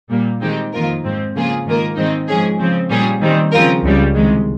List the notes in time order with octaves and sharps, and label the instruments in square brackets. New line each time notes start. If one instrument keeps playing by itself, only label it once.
[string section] A#2 G3 A#3
D#3 G#3 C4 D#4 G4
F2 D#3 A#3 F4 A#4
G#2 F3 C4
C#3 F3 A#3 F4 G#4
G#2 D#3 A#3 F4 A#4
G#2 D#3 G#3 C4 D#4
G#2 F3 G#3 C#4 G#4
C#3 F3 C4
A#2 G3 C#4 G#4
D#3 G3 C4
C#3 F3 C4 F4 A#4
C#2 C#3 G3
C2 C3 D#3 G#3